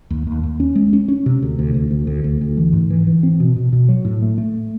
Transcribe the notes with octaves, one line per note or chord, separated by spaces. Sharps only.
D#2
D#2
D#2
C#4
G#3
C#4
C#4
C3
D2
D2
D2
D2
D2
D2
D2
E3
G#2
E3
E3
C4
B2
B2
B2
F#3
A2
A3
A3